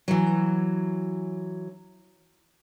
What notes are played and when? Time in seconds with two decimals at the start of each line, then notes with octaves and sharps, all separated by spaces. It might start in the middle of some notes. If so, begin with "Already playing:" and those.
0.08 E3 F#3